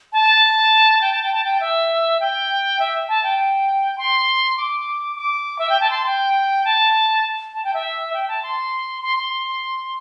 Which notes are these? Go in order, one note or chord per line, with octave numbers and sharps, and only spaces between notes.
A5
G5
A5
G5
A5
G5
E5
G5
E5
A5
G5
C6
D6
D6
E5
G5
A5
C6
G5
A5
A5
G5
E5
G5
A5
C6
C6
C6